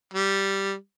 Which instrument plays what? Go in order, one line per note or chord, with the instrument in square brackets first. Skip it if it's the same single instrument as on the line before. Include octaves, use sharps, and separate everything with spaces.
[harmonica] G3